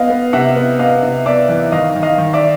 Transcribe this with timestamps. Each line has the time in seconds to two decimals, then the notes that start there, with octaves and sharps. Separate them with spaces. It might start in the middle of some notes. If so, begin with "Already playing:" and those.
Already playing: B3 D#5 F5
0.10 B3
0.33 C3 E5 F#5
0.56 B3
0.79 B3 D#5 F5
1.03 C3
1.25 B3 D5 E5
1.49 E3
1.72 D#3 D#5 F5
1.96 D#3
2.03 D#5 F5
2.18 D#3
2.33 D5 E5